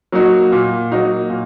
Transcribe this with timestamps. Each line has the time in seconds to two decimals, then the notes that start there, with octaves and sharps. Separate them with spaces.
0.12 F#3 A#3 D#4 F#4
0.52 A#2
0.91 F#3 A#3 D#4 F#4
1.30 A#2